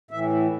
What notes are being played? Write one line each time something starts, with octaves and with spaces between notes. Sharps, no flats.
A2 E3 E5